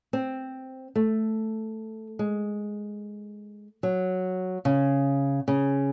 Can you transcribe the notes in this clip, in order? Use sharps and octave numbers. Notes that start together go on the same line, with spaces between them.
C4
A3
G#3
F#3
C#3
C#3